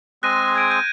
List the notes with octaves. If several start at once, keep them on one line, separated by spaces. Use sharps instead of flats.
G#3 C4 G#4 F#6 A#6 D#7
G#6 D7 D#7
G6 D#7